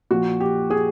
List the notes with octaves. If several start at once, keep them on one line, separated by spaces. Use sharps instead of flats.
A#2 F3 F#4
G4
G#4